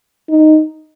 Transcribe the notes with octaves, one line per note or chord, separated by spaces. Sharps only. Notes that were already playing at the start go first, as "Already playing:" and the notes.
D#4